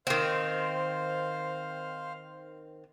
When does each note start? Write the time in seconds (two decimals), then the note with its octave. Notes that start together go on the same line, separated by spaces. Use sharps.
0.07 D#3 C4 C5 F5